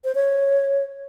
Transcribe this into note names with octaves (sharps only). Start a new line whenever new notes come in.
C5
C#5